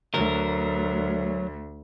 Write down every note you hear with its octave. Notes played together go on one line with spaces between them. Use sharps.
D2 F#3 A#4